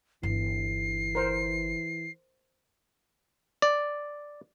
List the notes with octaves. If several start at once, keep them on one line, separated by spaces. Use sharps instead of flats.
G1 E3 D4 C7
A#4 C5
D5